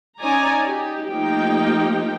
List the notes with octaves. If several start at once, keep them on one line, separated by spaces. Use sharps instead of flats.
C#4 D#4 C#5 D5 G#5 A#5
D#4 G4
F3 A3 A#3 D#4 G4 G5